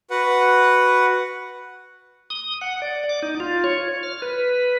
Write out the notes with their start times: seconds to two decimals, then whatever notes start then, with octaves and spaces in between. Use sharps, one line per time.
0.10 F#4 B4 F#5
2.30 D#6
2.61 F#5
2.82 D5
3.09 D6
3.22 D#4
3.40 F4
3.64 C#5
4.03 F6
4.22 B4